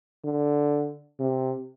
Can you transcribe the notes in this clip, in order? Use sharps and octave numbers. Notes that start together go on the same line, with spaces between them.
D3
C3